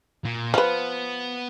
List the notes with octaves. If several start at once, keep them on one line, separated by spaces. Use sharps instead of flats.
A#2
F3 B3 B4